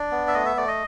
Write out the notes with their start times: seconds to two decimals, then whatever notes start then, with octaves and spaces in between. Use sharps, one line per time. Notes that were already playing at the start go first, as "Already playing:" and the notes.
Already playing: D4 D5
0.11 B3
0.28 E5
0.34 A3 D#5
0.46 E5
0.57 A3 D5
0.68 D#5